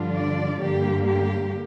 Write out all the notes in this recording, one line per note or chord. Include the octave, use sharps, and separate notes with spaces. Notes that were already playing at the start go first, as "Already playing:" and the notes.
Already playing: G2 D3 F3 D4 F4
D5
G2 D3 A#3 G4
G4